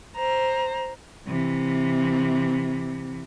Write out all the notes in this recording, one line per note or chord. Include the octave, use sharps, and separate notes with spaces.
C5 A#5
C3 E3